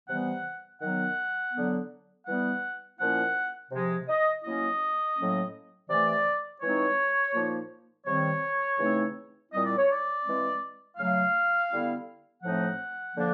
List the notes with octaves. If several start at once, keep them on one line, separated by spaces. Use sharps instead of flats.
C3 E3 G3 B3 F#5
D#3 F#3 B3 F#5
D3 F#3 B3
E3 G3 B3 F#5
A#2 F3 A#3 C#4 E4 F#5
C3 F3 G#3
D#5
F#3 A#3 C#4 E4 D#5
A2 F#3 A#3 C#4
C3 E3 A3 D5
E3 G#3 C4 D#4 C#5
A#2 F3 A#3 D#4
C3 D#3 G3 C4 C#5
C#3 E3 A3 C4 D#4
A#2 G3 C4 E4 D#5
D5
C#5
D5
E3 G#3 C4
C#3 F#3 A3 F5
D3 G3 B3 E4
A2 F3 A3 C4 D#4 F#5
D3 F3 A#3 D4